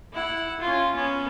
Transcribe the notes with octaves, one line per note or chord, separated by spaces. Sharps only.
E4 F#5
C#4 F4
B3 C#4